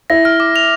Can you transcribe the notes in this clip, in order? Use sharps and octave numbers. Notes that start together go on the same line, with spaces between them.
E4 A#6
F6
D6
F7